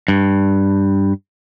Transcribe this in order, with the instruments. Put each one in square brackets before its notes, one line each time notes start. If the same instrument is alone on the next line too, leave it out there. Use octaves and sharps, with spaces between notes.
[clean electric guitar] G2